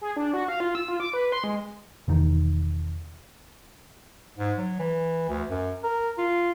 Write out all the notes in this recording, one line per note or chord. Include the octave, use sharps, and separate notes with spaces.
G#4
D4
F#4
F5
F4
E6
F4
D6
B4
C6
G#3
E1 E2 D#3
G#2
F#3
E3
D2
F#2
A#4
F4